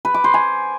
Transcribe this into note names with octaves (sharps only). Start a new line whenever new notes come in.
B4
D6
C5
G#5